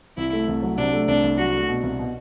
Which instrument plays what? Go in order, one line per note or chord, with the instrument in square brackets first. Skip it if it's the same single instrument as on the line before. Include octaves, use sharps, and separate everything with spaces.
[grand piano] C2 [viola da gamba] E4
[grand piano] A3
C2
F#3
[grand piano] C3 [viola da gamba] D4
[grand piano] A3
[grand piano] C2 [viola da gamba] D4
[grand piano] C2
[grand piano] F#3 [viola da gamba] F#4
[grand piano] A3
B2
C2
B2